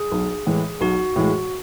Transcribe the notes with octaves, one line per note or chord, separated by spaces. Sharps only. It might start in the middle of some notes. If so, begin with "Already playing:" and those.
Already playing: G#4
B1
A2 E3 G#3
B1 F#4
A2 E3 G#3